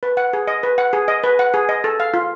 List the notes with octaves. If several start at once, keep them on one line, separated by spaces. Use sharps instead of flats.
B4
F#5
G#4
D#5
B4
F#5
G#4
D#5
B4
F#5
G#4
D#5
A4
F5
F4